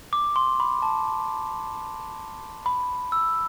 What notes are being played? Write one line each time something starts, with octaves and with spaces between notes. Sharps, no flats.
D6
C6
B5
A5
B5
E6